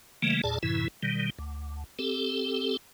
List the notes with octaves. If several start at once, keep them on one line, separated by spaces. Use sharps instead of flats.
C#3 E3 G3 A3 A#3
E2 A#2 G#4 D5 A5
F#2 A2 C3 E3 E4
B2 D#3 G3
D2
C4 G4 A4